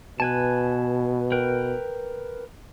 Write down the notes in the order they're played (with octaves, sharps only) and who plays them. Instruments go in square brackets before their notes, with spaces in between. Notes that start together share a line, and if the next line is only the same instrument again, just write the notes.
[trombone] B2 [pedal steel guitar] B4 G#5 A5
[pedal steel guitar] A#4 B4 G5